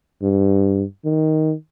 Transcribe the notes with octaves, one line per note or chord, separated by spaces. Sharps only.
G2
D#3